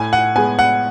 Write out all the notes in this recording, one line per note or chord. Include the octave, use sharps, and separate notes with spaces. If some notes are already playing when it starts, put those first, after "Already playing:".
Already playing: A2 G#5
F#5
G#3 B3 G#5
F#5